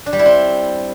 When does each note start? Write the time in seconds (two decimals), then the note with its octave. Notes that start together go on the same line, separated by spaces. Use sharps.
0.06 D4
0.13 G3
0.19 E4
0.26 C4